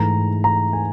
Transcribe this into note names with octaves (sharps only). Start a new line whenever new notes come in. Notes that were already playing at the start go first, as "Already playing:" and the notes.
Already playing: G#2 E3 A3 A#5
A#5
G#5